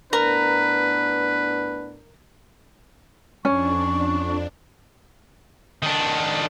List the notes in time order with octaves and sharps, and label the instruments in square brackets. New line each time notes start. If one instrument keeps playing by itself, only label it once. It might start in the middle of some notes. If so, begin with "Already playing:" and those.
[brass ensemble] A2 B3 D4 [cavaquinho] A#4 A#5 [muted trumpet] B4
[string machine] F2 D4 [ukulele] C#4 [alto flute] C#6
[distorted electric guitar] D#3 D4